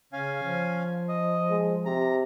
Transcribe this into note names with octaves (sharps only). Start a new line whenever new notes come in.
C#3 C#4 F5 G#5
F3
D#5
G#3
C3 A#5